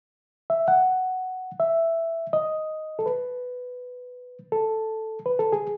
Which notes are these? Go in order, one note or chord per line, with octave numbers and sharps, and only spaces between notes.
E5
F#5
E5
D#5
A4
B4
A4
B4
A4
G#4